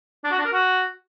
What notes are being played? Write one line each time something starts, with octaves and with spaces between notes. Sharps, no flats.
D4
F#4
D4
A#4
F#4